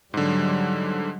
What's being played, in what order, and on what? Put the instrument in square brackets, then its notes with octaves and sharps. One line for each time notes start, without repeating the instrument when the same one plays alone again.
[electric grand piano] G#2 D3 [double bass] F#3 G3